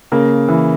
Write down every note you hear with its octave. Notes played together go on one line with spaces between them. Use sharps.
C#3 A#3 A#4
E3